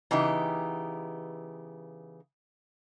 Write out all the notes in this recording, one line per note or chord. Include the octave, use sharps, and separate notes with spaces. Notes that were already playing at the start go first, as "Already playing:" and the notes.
C#3 E3 B3 D#4 G4